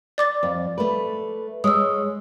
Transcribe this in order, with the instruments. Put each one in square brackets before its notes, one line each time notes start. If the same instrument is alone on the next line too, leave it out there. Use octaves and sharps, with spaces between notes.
[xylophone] D5 D6 A6
[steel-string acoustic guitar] F2
A3 B4
[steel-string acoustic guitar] G#3 C#5 [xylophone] D#6 E6